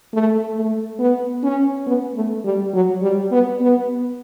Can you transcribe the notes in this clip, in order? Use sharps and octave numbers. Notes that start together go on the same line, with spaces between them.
A3
A3
B3
C#4
B3
A3
G3
F#3
G3
B3
B3